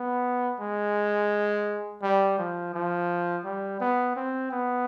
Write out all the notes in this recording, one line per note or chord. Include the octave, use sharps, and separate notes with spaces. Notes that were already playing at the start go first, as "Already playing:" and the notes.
Already playing: B3
G#3
G3
F3
F3
G3
B3
C4
B3